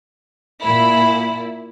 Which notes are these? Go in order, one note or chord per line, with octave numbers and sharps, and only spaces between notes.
A#2 E4 B5